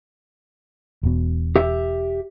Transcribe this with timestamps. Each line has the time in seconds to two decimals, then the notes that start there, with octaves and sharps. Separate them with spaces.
1.03 E1 B2
1.56 G4 E5